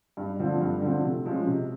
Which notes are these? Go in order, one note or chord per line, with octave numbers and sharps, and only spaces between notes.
G2
D3 F3 A3 C4
G2
D3 F3 A3 C4
C3
F3 G#3 C#4
C3